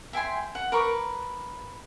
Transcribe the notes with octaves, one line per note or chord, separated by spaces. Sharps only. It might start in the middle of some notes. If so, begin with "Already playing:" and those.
E5 G5 G#5 C6
F#5
A#4 B4 C#6 D6